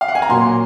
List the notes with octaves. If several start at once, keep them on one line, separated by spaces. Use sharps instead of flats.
F5
F#5
G#5
A#5
A#2 F#3 A#3 C6